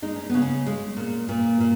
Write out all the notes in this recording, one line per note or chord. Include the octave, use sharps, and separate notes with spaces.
G#3 D#4
C#4
C#3 B3
C#4
G#3
A#2
A#2
A#2